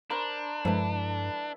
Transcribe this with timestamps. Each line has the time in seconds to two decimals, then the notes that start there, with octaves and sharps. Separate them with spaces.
0.10 D4 A#4 C5 B5
0.65 G2 F3 G#3 E4 A4 B4